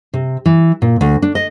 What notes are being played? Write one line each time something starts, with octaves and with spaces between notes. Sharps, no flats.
C3
E3
A#2
D2
D4
D#5